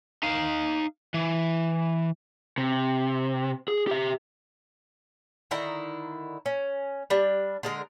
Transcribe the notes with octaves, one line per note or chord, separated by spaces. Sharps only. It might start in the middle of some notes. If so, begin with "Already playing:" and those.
D#4 F5
E3
C3
G#4
G4 E5
D3 D#3 E4 A#5
C#4
G3 D4
D3 G#3 A#4